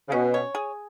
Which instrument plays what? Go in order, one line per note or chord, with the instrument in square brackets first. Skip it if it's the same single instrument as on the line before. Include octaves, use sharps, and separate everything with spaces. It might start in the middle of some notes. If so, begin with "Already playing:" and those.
[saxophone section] C#3
[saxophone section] B2 [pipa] C#4
[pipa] C#5
G#4